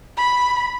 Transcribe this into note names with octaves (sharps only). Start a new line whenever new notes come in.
B5